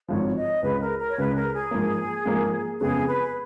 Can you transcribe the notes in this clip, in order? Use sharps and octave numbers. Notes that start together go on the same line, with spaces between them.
G#1 G#2 F3 C#5
D#5
C#2 C#3 G#3 B4
A#4
A#4
C#5
C#2 C#3 G#3 B4
A#4
G#4
G#2 F3 A#3
G#2 F3 A#3
F2 C#3 G#3 B3 G#4
B4